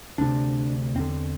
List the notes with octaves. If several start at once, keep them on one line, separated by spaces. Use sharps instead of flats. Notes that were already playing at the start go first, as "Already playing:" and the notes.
D2 C3 D4
E2 D3 C4